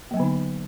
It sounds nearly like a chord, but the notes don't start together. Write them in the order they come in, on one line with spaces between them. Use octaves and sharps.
A#3 F#3 B3 D3 D#4